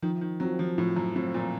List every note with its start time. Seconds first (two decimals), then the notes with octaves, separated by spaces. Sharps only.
0.02 D#3 F3
0.21 D#3
0.40 F#3 C4 F4
0.59 F3
0.78 A2 F3
0.97 F#2
1.16 A2 C4 F4
1.34 A#2